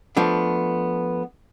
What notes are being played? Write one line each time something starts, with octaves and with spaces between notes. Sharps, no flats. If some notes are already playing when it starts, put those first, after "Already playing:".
F3 A3 B3 D4